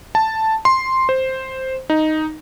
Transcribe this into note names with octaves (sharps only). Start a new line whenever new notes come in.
A5
C6
C5
D#4